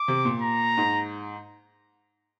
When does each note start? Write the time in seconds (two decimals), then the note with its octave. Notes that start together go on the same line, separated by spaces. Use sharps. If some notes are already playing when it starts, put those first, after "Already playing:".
Already playing: D6
0.08 C3
0.25 A#2
0.42 A#5
0.77 G#2